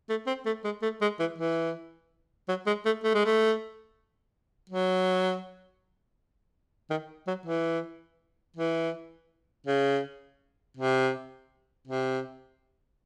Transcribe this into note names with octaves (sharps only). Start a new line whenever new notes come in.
A3
C4
A3
G#3
A3
G#3
E3
E3
F#3
G#3
A3
A3
G#3
A3
F#3
D#3
F#3
E3
E3
C#3
C3
C3